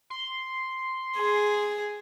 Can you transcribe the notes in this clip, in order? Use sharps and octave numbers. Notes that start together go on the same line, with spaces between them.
C6
G#4